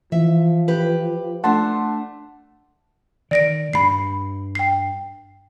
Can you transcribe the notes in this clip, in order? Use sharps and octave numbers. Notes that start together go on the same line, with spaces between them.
E3 F3 E5
G4 B4
A3 D4 F#5 A5 C6
D#3 D5 A#6 D7
G2 B5 C7
G5 C7